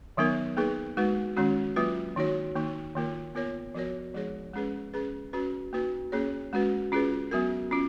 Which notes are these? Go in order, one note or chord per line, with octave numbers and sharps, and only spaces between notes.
D#3 F#3 B3 D#4 A#4
A#3 D#4 G#4 B4
G#3 D#4 F#4 B4
D#3 G#3 C#4 F#4
F#3 A#3 F4 B4
D#3 A#3 D#4 F#4 C#5
D#3 A#3 D#4
D#3 A#3 F4 A#4
B3 F4 A#4 C#5
F3 B3 F#4 A#4 C#5
F3 G#3 D#4 G#4 C#5
G#3 C#4 G#4 B4
C#4 G#4 B4
C#4 F#4 B4
A#3 D#4 F#4 B4
A#3 C#4 G#4 C#5
G#3 C#4 F#4 B4
C#4 F4 G#4 B4
F#3 B3 F#4 A#4
C#4 F4